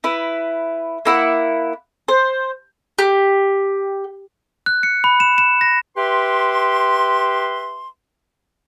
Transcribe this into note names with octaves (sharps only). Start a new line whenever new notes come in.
E4 B4
A#3 E4 F#5
C5
G4
F#6
C#7
B5
E7
E7
A#6
G4 B4 E5 C6